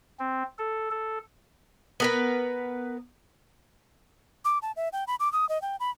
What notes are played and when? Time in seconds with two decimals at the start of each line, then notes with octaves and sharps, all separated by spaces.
0.19 C4
0.59 A4
0.91 A4
2.00 B3 A#4 B4
4.45 D6
4.62 A5
4.77 E5
4.93 G5
5.07 B5
5.20 D6
5.33 D#6
5.49 D#5
5.62 G5
5.80 B5